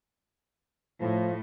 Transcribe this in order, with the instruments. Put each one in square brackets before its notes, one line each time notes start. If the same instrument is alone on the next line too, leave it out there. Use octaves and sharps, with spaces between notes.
[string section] A2 [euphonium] F3